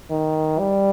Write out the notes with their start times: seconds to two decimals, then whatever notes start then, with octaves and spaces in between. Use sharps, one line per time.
0.10 D#3
0.59 G3